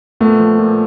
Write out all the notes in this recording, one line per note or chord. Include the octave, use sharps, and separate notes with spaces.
A#2 A3 B3
F3
A#2